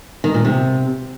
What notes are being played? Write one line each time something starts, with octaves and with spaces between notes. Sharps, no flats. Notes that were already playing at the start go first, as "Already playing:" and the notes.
D#3
A#2
C3